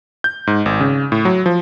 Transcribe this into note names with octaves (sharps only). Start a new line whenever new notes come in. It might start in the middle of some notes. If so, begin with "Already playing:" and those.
G6
G#2
G#1
C#3
A2
F#3
F3